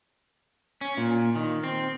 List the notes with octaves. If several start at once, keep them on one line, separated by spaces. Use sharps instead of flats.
C#4
A#2
D#3
C4